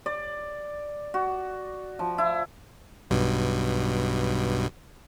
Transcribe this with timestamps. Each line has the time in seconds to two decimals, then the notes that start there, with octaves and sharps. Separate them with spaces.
0.06 D5
1.14 F#4
1.99 F3
2.18 E4
3.10 B1 G2 B2